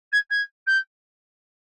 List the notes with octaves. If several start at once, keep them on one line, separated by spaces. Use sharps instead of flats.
G#6
G#6
G6